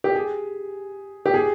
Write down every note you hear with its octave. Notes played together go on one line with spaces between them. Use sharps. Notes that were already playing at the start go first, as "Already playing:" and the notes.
G4
G#4
G4
G#4